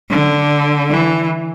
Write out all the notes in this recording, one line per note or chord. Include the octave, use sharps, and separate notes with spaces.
D3
E3